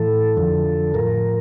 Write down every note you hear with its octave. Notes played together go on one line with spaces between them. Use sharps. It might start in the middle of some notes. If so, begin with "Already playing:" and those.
Already playing: A2 E3 A4
F2 D3 F3
A2 F3 A#4